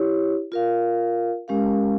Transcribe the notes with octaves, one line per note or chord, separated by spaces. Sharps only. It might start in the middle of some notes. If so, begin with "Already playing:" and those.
Already playing: E4 G4 C#5
F4 A#4 F5
G#3 C#4 G4 A#4 F5